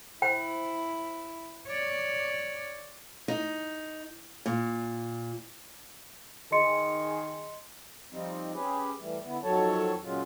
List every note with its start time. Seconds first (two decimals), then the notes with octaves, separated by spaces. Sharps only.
0.22 E4 C5 G5
1.66 C#5 D5
3.28 D#4
4.46 A#2
6.52 D#3 G#4 D#5 C6 C#7
8.12 F3 G3 C4 D#4
8.54 C#4 G4 G#4 B4
9.00 E3 G3 A3
9.24 D3 B3 E4
9.44 F2 D#3 F#3 A4 C#5 A5
10.03 A#2 C#3 F#3 G#3 F4